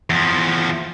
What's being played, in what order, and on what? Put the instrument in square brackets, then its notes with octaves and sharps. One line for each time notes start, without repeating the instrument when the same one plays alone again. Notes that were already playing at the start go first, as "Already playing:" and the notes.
[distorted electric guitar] E2 F3